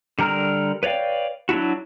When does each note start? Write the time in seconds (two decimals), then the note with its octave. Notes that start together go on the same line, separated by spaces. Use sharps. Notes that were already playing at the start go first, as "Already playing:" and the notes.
0.19 D3 G3 A#4 A#5 F6
0.83 B4 C#5 D5 F5 G5
1.49 F#3 D4 E4 F#4